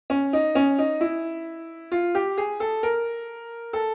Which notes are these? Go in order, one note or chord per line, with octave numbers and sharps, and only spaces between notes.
C#4
D#4
C#4
D#4
E4
F4
G4
G#4
A4
A#4
A4